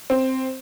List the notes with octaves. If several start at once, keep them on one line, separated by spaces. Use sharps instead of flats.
C4